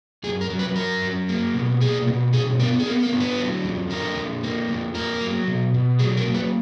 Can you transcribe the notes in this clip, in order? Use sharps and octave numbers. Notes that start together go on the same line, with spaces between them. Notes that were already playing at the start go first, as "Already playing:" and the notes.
F#2 G#4
A#4
F#3
B4
F#2 A#4
F#3
A#3
B2
A#3 G#4
B2
D3 G#4
B3 A#4
G#4
B3 A#4
A#4
D3
B4
F#3
F2
D3 A#4
F2
A#3
F2
A#3 A#4
F#3
B2
B2
F#3 G#4
A#4
A#3
B4